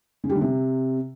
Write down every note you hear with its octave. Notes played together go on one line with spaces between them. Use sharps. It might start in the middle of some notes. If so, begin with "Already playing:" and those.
C#3
G3
D3
C3